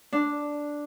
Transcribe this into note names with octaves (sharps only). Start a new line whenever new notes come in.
D4